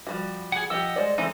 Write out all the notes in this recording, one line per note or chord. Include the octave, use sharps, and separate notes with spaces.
F3 G3 F#4
G#4 F#5
F3 G4 D#5 F#5 E6
G#3 C5 D5
E3 G#3 C4 D#4 A4